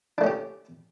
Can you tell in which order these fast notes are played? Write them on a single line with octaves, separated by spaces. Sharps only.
D4 A3 C#4 G4